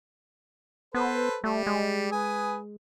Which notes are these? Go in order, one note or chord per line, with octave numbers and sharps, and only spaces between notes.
B3 A4 B4 C5
G3 A3
G#3
B4 G#5 D#6